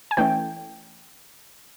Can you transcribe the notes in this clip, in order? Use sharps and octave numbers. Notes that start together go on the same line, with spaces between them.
G#5
E3 A3 C#4 G5